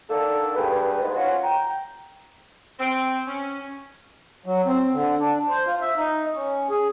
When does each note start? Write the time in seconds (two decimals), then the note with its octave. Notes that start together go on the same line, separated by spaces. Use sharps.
0.09 D3 D#3 A#3 D4 A4
0.55 G2 A#3 G4 G#4 B4
1.01 G#2
1.15 C#4 F4 F#4
1.43 G5 A#5
2.80 C4
3.27 C#4
4.46 F#3
4.66 C4
4.93 D3
5.20 D4
5.48 C5
5.66 F4
5.81 E5
5.97 D#4
6.35 C#4
6.70 G#4